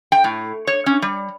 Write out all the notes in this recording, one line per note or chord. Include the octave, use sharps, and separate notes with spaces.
G5
A2
C#5
C#4
G3